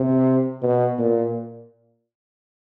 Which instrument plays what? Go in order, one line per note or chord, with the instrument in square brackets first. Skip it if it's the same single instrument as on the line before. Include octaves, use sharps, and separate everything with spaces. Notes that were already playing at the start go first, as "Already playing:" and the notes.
Already playing: [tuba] C3
B2
A#2